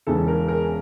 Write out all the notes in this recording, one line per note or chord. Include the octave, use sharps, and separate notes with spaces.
E1 E2 C#3 E3 A4
A#4
A#4